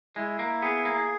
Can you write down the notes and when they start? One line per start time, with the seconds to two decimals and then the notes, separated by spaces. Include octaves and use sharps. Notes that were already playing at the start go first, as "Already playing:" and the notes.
0.16 G#3 E4
0.39 A#3
0.62 B3 G#4
0.85 A#3